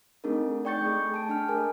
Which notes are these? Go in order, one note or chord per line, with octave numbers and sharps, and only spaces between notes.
A3 C4 D4 D#4 G#4 A#4
D5 G5 C#6 G6 A6 C#7
A3 G#4
A5 D7
D4 G5 F6
A3 G#4 A#4 G#5